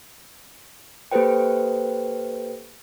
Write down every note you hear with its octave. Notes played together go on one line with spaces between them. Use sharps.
A#3 G4 A4 B4 C5 G5